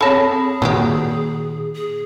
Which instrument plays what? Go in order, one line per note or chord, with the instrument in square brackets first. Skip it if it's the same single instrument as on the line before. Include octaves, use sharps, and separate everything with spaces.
[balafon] C4 C#5 B5 [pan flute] G#4 [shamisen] A4 A5
[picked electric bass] A#2 D#3 [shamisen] F#3 G3 G4
[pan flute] G#4